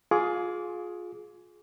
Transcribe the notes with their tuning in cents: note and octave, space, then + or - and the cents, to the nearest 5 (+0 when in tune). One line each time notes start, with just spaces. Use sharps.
F4 +25 G#4 +15 D6 -25